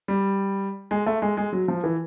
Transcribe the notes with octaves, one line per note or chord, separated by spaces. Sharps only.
G3
G#3
A3
G#3
G#3
F#3
F3
E3